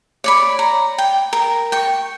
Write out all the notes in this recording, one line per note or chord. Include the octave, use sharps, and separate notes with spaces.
C#5 D5 B5
A#5
G5
A#4
G5 C#6